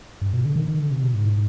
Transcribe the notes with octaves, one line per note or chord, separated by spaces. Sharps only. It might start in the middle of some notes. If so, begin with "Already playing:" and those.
G2
B2
D3
D#3
D#3
D3
C3
B2
G#2